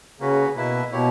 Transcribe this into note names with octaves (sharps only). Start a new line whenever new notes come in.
C#3 A#3 C#4 F#4 B4
B2 A#3 E4 B4 E5
B2 A#3 E4 G4 C#5